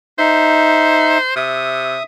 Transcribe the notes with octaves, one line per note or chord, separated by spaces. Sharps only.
D#4 C5 E5
C3 E5 D#6